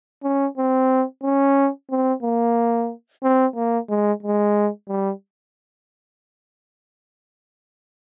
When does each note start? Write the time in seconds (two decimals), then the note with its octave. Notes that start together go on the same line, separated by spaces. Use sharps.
0.24 C#4
0.58 C4
1.23 C#4
1.90 C4
2.23 A#3
3.23 C4
3.56 A#3
3.89 G#3
4.23 G#3
4.88 G3